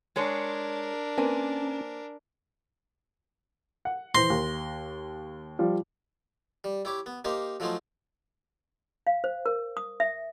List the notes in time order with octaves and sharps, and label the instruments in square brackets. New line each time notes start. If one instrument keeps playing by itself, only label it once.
[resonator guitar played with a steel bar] G#3 G#4 C#5 [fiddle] D4 A#4
[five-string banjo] A#3 C4 B4 [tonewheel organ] C#4 A5 [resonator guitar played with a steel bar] G#5
[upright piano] F#5
[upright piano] E3 C5 A#6 [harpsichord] C6
[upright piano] D#2
F3 G3
[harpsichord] G3
E4 G4 C#5 D6
B3
A#3 D#4 G4 C5 F5
F3 F#3 A3 C#4 D#4 C5
[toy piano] F5
C5
A#4
D#6
E5